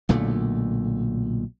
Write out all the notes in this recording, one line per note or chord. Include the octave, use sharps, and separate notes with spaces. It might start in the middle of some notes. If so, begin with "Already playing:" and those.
B1 A#2 D3 A3